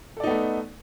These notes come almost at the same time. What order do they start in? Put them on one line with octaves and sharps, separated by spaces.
A4 D5 D#4 B3 A3